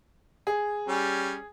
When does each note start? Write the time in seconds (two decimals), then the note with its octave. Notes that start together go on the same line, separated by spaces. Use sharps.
0.47 G#4
0.88 G3 C#4